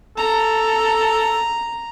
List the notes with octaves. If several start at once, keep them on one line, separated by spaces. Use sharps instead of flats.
A4 A#5